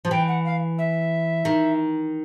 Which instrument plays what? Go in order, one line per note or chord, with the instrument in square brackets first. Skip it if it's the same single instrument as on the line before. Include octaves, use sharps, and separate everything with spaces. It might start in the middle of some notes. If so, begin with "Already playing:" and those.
[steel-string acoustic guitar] F3
[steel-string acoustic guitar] E3 [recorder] G5
[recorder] F#5
F5
E5
[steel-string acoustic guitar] D#3